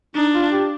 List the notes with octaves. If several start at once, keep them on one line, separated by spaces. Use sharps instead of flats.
D4 D#4
F4
G4